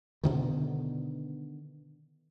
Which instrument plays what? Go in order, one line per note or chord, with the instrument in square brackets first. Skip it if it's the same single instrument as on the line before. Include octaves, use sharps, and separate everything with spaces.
[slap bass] B2 D3 D#3